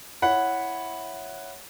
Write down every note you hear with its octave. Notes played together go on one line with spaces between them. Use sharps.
E4 C#5 E5 F#5 B5